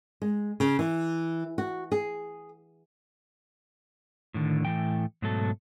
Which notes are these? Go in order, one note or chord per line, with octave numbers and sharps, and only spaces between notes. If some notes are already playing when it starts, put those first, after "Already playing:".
G#3
C#3
E3
F#4
G#4
A2 D3 D#3
A2 E3 A3 G5
G#2 B2 F#3 A3 A4